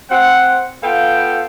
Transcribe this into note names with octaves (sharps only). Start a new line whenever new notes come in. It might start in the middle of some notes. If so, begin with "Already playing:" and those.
C4 F#5
B3 F4 A4 F5 G5